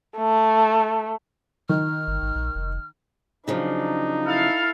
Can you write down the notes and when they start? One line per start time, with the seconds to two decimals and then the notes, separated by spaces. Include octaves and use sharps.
0.17 A3
1.69 D#3 F6
2.07 G1
2.22 G#1
2.35 A#1
2.55 F1
3.48 C#3 F3 F#3 D4 D#4
4.26 E4 A4 F5